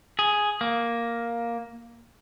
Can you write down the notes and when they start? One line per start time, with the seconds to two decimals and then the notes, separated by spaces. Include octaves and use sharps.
0.19 G#4
0.61 A#3